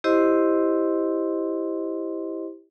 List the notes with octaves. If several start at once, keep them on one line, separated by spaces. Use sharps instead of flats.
E4 G4 C5 D#5 C6